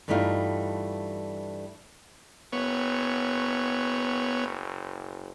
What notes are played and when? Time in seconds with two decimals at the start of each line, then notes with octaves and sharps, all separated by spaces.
0.08 G2 E3 G3 A3 D#4 F4
2.53 F#1 B3 C#5